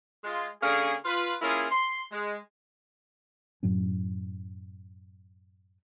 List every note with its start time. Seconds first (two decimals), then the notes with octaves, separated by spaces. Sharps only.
0.24 G#3 F4
0.61 D3 A#3 C#4 G#4
1.04 F4 B4
1.42 A#3 C#4 E4 F4 G#4
1.71 C6
2.12 G#3
3.63 F#2 A2 F#3 C#4